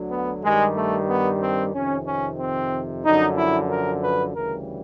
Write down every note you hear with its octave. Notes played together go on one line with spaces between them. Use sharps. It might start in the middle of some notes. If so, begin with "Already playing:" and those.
Already playing: D2 D3 F#3
B3
G2 D#3 G3 G#3
A3
B3
C4
F2 C3 D#3 C#4
C#4
C4
F#2 D3 F3 D#4
E4
A#4
B4
D2 C#3 E3 G3 A#4